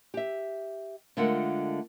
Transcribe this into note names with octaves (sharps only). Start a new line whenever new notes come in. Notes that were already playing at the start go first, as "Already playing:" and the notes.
G4 E5
D3 G#3 A3 F4 A#4 F#5